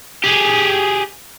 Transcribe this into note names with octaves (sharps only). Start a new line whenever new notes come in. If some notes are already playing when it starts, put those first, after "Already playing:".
G4 G#4